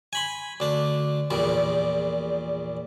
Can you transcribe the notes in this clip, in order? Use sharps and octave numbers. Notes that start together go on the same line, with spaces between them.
G#5 B5 C6
D2 D4
A#1 E2 A#2 G3